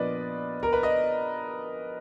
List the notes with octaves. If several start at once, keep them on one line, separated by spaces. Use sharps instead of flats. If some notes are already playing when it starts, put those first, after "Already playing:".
Already playing: A#2 F3 B3 D4 B4 D5 D#5
A#4
B4
D#5